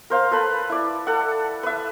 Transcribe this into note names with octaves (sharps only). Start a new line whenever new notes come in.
A#4 C5 F5
A4 B4 B5
E4 D5
A4 F#5
B4 E5